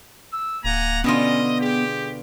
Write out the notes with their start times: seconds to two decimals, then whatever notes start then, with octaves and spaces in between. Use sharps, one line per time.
0.33 E6
0.65 D1 A#3 F#5 G#5 A#5
1.04 B2 D3 B3 C#4 F4 D#5
1.59 G4 G#4